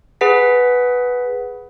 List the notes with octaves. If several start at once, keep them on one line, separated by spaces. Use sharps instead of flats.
G#4 B4 F#5 B6